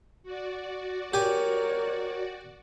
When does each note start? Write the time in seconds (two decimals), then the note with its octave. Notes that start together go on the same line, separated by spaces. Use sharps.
0.23 F#4 D5
1.14 G4 A#4 C#5 G#5